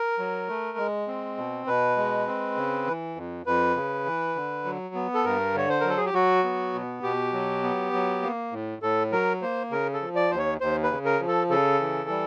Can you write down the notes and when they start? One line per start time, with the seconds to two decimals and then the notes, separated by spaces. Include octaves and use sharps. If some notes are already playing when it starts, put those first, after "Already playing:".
Already playing: A#4
0.19 F#3
0.48 A3
0.78 G#3
1.08 C4
1.37 B2
1.67 B2 B4
1.97 G#3
2.27 C4
2.56 C#3
2.87 E3
3.16 F2
3.46 F2 B4
3.76 C#3
4.06 E3
4.36 D3
4.65 F#3
4.95 B3
5.14 A4
5.24 G2 A#4
5.55 D3 C#5
5.69 C5
5.81 F#3 A#4
5.89 A4
5.97 G#4
6.06 G4
6.14 F#3 F#4
6.44 B3
6.74 B2
7.03 B2 G4
7.33 F#3
7.63 B3
7.93 F#3
8.22 A#3
8.52 A2
8.82 A2 A4
9.12 F#3 A#4
9.42 A#3 C5
9.71 C#3 A#4
9.93 A4
10.01 F3
10.15 D5
10.31 D#2 C5
10.38 C#5
10.61 D#2 C5
10.83 B4
10.91 C#3
11.05 A#4
11.20 F3
11.28 A4
11.50 C#3 A4
11.80 E3
12.10 G3